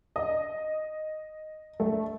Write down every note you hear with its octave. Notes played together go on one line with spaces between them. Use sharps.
D#5
A3